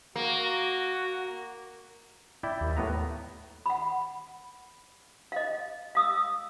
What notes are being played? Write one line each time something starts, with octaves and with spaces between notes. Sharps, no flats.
A#3 F#4
E4 D5 G5
D#2
A2 B3 A#5
F#5 B5
D#5 F5
F5 D#6 E6